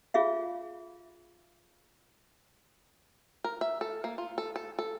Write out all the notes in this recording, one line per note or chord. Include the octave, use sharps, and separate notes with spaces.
F4 G#4 E5 F5
A#4
E5
A4
A#3
F4
A4
A4
A4